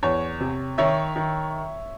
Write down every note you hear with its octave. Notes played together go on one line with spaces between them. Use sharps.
E2 C#5
C3
D#3 C#5 E5
D#3